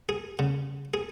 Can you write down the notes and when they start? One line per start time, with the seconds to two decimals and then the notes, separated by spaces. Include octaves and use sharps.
0.09 G#4
0.39 C#3
0.94 G#4